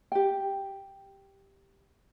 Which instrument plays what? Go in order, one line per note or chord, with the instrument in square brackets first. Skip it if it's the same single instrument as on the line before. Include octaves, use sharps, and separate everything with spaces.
[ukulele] G4 G5